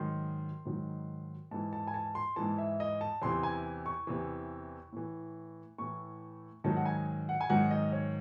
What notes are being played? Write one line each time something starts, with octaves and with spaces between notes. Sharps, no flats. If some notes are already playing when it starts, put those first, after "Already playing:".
Already playing: G#2 D#3 F#3 C6
G#2 D#3 F#3
G#2 E3 A5
A5
G#5
A5
C6
G#2 E3 A5
E5
D#5
A5
E2 C3 E3 C6
G#5
C#6
E2 C3 E3
A2 E3
A2 E3 C#6
G#2 D#3 F#3 A5
F#5
G#5
F#5
G#5
G#2 D#3 F#3 F#5
D#5
C#5